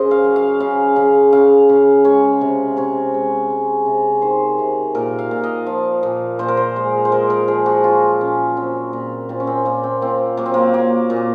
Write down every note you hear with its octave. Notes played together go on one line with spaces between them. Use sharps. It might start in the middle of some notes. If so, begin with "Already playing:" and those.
Already playing: C#3 G#4 A#4 C5 D#5
F5
F#3
F5
C#3 F5
C#3
C#3 F5
C#3
G#3 C#5
C3
C3 C#5
G#3
G#3
C3
D#3 C5
C3
A#2 A#4
F5
A#2
D#5
F3
A#2
A#2 C5
A#4
C5
G#3
C5
G#3 A#4
A#4
F3 G#4
F#4
F#3 F4
A#2 C#4
F#3 C4
A#2
A#2 C4
C#4
C4
A#2 A#3
C4
A#2 C4
F#3 A#3
C4
A#3
F#3 A#3
A#2